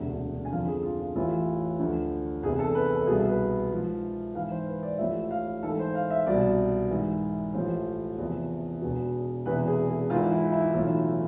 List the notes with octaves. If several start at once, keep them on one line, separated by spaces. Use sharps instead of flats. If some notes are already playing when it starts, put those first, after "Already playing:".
Already playing: E1 D2 C3
G#5
F1 F2 D3 F3 F5
G#4
F4
F4
A1 A2 E3 F4
D2 D3 F3
F1 E2 C3 G#4
A4
B4
A4
C2 B2 G#4
B4
G#1 G#2 F3
G#1 G#2 E3 F5
C5
B4
D5
A1 A2 F3 E5
F5
G#1 G#2 E3 A4
C5
F5
E5
C2 B2 D5
G#1 G#2 E3
A1 A2 F3 C5
E2 C3 F3
E1 E2 B2
E1 E2 C3 E3 B4
G#4
G#4
G#1 G#2 E3 F4
E4
E4
B1 A2 E3 F4